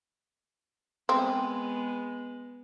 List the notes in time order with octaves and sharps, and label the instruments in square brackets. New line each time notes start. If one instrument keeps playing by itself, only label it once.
[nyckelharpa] G#3 B3 [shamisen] C4